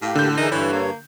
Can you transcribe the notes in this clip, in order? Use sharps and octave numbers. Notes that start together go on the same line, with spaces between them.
A2 A#3 G4
D3 G6
E3 D#4 G#4 A#4
G2 E3 C#5
A#3